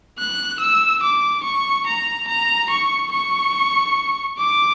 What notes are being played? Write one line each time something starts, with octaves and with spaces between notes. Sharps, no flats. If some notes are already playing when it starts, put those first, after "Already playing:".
F#6
E6
D6
C#6
A#5
A#5
C#6
C#6
D6